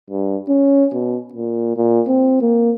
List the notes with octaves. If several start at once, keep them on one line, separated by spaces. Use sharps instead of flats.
G2
C#4
B2
A#2
A#2
C4
A#3